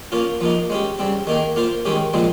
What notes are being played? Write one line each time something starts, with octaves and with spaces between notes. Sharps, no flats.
A#3 C#4 F4
F3 A#3 D#4
G#3 C#4 G4
C#3 G3 C4
D#3 A#3 D#4 G#4
A#3 F4 C5
D#3 G#3 C#4 G4
A#2 F3 G#3 C4